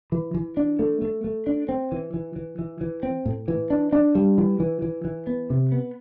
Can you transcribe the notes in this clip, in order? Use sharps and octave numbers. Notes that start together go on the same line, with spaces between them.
E3
E3
D4
A3
A3
A3
D4
C4
E3
E3
E3
E3
E3
C4
A2
E3
D4
D4
G3
E3
E3
E3
E3
B3
C3
B3